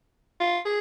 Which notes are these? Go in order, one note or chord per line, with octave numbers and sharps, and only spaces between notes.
F4
G#4